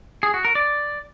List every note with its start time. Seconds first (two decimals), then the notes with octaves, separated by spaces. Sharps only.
0.23 G#4
0.34 F#4
0.45 A#4
0.55 D5